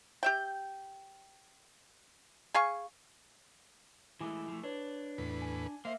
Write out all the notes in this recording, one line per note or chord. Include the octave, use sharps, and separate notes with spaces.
G4 E5 G5
G#4 F5 G#5 C#6
E3 G#3 A3 E4 G#5 D6
F3 A3
D4 B4 C#5
E2 A2 B4
G#5
A#3 C5 E5 F5